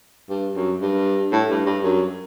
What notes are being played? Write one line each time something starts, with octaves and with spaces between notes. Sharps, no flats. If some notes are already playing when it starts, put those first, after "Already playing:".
G2
F#2
G2
A2
G2
G2
F#2